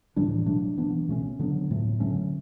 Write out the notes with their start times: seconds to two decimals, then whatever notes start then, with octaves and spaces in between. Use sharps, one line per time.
0.16 A2 E3 G3 D4
0.46 B2 F#3 A3 D4
0.77 E3 B3 D4
1.09 B2 A3 C#4
1.39 D3 F#3 B3 D4
1.70 A2 F#3 A3
2.00 D3 F#3 A3 C#4